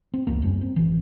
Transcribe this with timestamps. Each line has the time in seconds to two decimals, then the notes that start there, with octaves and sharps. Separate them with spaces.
0.14 C4
0.27 E1 C#2 A#3
0.42 F#1 F#2 G3 C#4
0.61 C4
0.76 G#1 E3